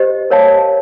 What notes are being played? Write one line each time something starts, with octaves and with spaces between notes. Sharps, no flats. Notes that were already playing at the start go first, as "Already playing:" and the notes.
Already playing: G4 C5 D#5
A#4 C#5 F5 A5